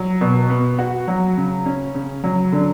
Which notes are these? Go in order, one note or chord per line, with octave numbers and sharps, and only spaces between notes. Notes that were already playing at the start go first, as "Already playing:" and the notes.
Already playing: F#3
B2
B3
F#4
F#3
C#3
C#4
C#3
F#3
D3